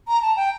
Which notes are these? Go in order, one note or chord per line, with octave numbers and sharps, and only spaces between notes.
A#5
A5
G5